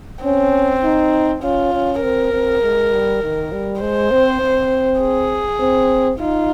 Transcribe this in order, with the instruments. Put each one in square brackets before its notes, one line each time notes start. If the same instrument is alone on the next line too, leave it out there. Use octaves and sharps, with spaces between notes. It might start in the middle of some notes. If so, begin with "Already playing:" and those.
[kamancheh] C4 [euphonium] C#4
[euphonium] D#4
[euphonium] C#4 [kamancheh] F4
[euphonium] C#4
[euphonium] C4 [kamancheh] A#4
[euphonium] C4
G#3
G3
D#3
G3
[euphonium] G#3 [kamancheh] C5
[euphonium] C4
C4
[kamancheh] G#4
[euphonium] C4
[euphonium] D#4 [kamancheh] F4